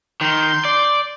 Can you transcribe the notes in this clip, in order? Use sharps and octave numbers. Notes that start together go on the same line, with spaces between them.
D#3 C6 G6
D5